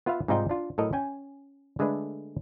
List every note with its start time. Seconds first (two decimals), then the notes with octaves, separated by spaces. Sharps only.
0.06 B3 F4 B4 E5 F5
0.28 G#2 C3 G3 D#4 F4 G5
0.49 D4 F4
0.78 A2 F#3 A4 A#4 D#5
0.93 C#4 G5 G#5
1.79 D3 G#3 A3 D4 B4